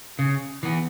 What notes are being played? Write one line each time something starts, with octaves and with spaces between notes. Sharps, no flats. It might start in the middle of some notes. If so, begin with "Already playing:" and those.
C#3
E3 B3